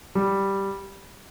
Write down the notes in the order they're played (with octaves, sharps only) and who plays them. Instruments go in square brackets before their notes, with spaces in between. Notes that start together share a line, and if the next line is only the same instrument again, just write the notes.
[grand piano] G3